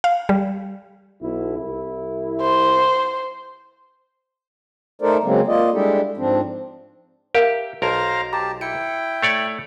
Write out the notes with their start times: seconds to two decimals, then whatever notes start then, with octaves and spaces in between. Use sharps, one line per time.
0.04 F5
0.29 G3
1.22 B1 E4
1.57 C2 E4
2.41 C5
5.02 A3 D#4 A4 A#4 C5 D5
5.23 C#3 F#3 G#3 A#3 C4
5.47 A#3 F4 D5 D#5
5.73 G3 G#3 D4 E4 G4 A4
6.17 G#2 F3 C4 D4
7.35 G4 A#4 E5 F5
7.82 B1 A#4 C5 F5 A5 A#5
8.33 G4 A5 A#5
8.61 E4 G5 C#7
9.23 A3 C#5 D5